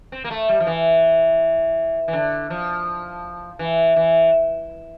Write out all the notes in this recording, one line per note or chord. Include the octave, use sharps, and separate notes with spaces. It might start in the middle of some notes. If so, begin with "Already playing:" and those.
C4
A#3
A3
G3
F3
E3
E3
D3
F3
E3
E3